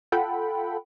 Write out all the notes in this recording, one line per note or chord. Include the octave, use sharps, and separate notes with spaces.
F4 A4 F#5 G5 B5